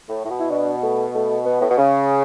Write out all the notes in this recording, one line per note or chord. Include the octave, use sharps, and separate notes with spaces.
A2
A2
B2
E4
B2 D4
A3
A3
B3
A2
B2
C#3 C#4